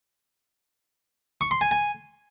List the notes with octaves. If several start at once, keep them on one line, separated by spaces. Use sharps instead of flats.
C#6
C6
G#5
G#5